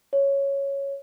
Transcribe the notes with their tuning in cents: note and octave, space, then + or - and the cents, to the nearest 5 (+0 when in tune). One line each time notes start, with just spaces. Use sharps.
C#5 +0